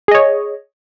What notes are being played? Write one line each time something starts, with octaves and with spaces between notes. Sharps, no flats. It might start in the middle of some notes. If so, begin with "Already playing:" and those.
G#4 C#5 D#5